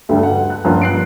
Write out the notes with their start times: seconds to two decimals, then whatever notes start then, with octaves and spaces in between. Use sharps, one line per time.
0.09 D2 G2 G3
0.23 F#5
0.50 F#6
0.65 G2 F3 A#3 C#4
0.82 F#6 C7 D7